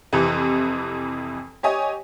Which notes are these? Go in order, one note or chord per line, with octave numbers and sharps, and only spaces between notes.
F2 C3 E3
G4 C#5 D#5 G#5